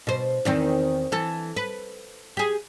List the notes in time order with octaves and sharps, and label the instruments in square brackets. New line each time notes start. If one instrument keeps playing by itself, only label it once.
[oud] B2 C5
E2 D#3 C4
E3 A4
B4
G4 G#4